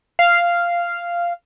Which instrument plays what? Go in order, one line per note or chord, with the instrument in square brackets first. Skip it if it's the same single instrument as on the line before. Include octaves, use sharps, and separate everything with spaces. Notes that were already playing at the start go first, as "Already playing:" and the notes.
[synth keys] F5